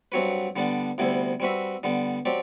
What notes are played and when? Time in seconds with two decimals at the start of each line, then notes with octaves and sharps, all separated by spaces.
0.12 G2 F#3 C4 F#4 B4
0.56 D3 G3 B3 D4
0.98 D2 C3 G3 B3 E4
1.40 G3 C4 F#4 B4 E5
1.83 D3 G3 B3
2.25 F#3 C4 G4 D5